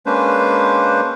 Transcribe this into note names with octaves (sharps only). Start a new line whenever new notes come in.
G#3 A#3 C#4 D4 B4 C5